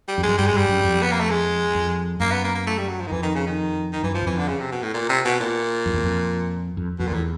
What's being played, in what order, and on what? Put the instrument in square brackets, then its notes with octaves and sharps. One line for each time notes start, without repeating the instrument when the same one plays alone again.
[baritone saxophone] G3
[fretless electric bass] F2
[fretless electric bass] F#2 [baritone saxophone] G#3
[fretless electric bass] G2 [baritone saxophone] G3
[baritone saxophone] G#3
[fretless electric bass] G2 [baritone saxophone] G3
[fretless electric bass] F#2
F2
[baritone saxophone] B3
A#3
A3
G#3
[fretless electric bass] F2
[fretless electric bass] F#2 [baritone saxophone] A#3
[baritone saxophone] B3
A#3
A#3
A3
G3
F#3
F3
D#3
[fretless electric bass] F2 [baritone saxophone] E3
[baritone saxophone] D#3
C#3
D#3
D#3
[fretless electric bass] F#2 [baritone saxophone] E3
[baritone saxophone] F3
[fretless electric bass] E2
[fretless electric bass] F2 [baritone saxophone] E3
[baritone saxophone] D3
C#3
C3
B2
A2
A#2
C3
B2
A#2
[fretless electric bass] F2
E2
F2
F2
[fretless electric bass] F2 [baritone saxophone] B2
[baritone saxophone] A#2
[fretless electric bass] E2 [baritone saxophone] A2